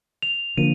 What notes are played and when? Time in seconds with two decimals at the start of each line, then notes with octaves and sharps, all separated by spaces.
0.22 F7
0.57 D3 F3 A#3 D#7